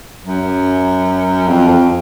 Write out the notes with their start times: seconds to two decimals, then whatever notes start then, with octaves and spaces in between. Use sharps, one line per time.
0.25 F#2
1.48 F2
1.68 F2